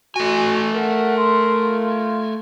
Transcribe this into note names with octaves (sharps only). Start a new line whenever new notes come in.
A3 F#4 G#5
A#4 F#5
C6
F4